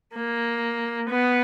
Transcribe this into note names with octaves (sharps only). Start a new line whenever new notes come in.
A#3
B3